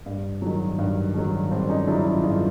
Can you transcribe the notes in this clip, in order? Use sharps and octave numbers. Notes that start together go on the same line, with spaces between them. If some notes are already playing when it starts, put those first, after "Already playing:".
G2
D#3 F#3
G2
D#3 F#3
G2 C4 D4
C#4 D#4
D#3 F#3 D4 E4
D#4 F4
G2 D#4 F4